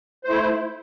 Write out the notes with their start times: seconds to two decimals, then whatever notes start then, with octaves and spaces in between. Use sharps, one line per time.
0.24 C5
0.27 A3
0.30 E4